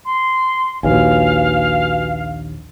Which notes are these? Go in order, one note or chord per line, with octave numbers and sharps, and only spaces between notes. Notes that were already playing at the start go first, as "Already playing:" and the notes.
C6
A#1 D#2 F#4 B4 F5 G#5